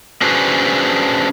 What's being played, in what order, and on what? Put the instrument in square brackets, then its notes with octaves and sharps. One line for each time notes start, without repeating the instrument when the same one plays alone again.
[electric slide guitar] C#4 D4 F#4 G#4 B4 C5